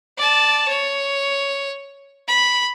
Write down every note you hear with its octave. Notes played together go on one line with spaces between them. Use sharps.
D5 A5
C#5
B5